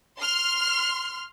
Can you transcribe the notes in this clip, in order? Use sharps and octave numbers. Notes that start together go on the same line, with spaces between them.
C6 F6